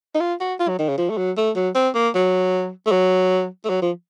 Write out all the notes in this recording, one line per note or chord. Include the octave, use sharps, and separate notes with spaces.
D#4
F4
F#4
F4
F#3
D#3
C#3
F3
A3
F#3
A3
F#3
C4
A#3
F#3
A3
F#3
A3
F#3
F3